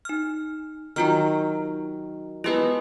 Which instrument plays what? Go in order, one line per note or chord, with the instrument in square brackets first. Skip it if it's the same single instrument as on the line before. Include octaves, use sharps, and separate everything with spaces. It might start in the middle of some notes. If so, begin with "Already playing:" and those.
[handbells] D#4 F6
[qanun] D#3 F#3 [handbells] D#4 F4 F6
[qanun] G#3 B3 C5 [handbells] E4 G4 B4